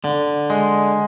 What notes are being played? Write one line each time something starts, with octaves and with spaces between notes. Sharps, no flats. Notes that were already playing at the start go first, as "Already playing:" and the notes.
D3
G#3